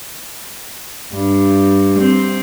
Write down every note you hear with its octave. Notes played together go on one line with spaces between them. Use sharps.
G2
C4